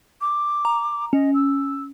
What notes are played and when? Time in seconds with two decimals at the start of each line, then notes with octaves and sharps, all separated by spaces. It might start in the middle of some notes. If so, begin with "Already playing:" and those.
0.21 D6
0.65 A#5
1.13 C#4 D#5
1.34 E6